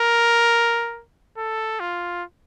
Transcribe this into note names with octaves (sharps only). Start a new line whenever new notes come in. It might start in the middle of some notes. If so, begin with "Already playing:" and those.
Already playing: A#4
A4
F4